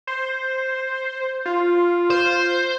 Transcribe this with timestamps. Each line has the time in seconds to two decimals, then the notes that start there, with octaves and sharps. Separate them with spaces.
0.07 C5
1.45 F4
2.10 C5